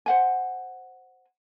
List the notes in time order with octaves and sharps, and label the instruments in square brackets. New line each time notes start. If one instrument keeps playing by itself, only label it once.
[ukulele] C5 F#5 G#5